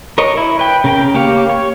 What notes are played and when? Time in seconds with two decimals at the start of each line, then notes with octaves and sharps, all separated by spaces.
0.18 A#4 C#5 D#5
0.37 E4
0.59 B4 G5
0.84 C#3 A#4 G5
1.14 A#3 G4 C#5 F5
1.50 C#5